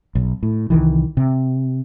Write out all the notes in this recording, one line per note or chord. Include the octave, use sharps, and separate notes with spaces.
B1
A2
C2 D#3 E3
C3